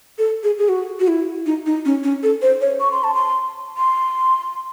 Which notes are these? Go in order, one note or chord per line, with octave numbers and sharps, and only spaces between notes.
A4
G#4
G#4
F#4
F#4
E4
D#4
D#4
C#4
C#4
A4
C5
C#5
C#6
C6
A5
C6
C6